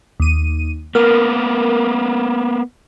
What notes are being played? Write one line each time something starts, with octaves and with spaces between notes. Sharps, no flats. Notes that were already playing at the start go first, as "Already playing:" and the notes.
D#2 D#7
A#3 B3 A#4